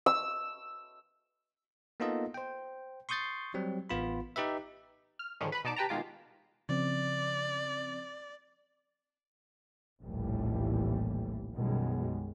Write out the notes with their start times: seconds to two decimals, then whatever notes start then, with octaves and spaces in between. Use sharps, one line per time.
0.06 E6
2.00 A#3 B3 D#4 F4 A4 D#5
2.34 C5 G5
3.09 C6 C#6 D#6 G6 A6 C7
3.54 F#3 G3 C4
3.90 A1 B3 F4 B5
4.36 D#4 G4 B4 E5
5.19 F6
5.40 G#2 D3 D#3 F3 G#3 C#4
5.52 B4 B5
5.64 B2 D#4 D5 A5 D6
5.76 G4 B4 G5 A5 A#5
5.89 B2 D#3 G#3 F4 D6
6.69 C#3 F3 C4 D5
10.02 F1 A#1 D#2 A2 E3 G3
11.55 B1 F#2 B2 D#3 G3 G#3